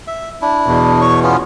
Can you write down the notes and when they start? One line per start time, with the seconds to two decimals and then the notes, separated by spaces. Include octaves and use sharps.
0.07 E5
0.42 D4 E4
0.66 E2 B2
1.02 C#5 C#6
1.23 B3 C#4 F4